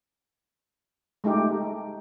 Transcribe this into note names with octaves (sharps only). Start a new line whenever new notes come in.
G#3 A3 D#4 G4